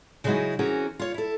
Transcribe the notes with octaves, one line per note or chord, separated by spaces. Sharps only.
C#3 F#3 G#3 D#4 E4 F#4
E3 C4 C#4 F#4 G#4 A#4
F4 C#5
E4 A4